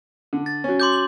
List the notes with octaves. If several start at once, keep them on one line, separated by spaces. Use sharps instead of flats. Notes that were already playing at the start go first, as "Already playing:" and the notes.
D3
A6
F#3 C#4
C6 D6 G6
F#7